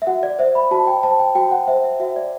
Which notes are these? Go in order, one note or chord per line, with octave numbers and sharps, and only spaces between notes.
E5
F#4 F#5
D5
C5 E5
B5
F#4 A5
G5
C5 A5
G5
F#4 G5
F#5
C5 E5
E5
F#4 E5
D5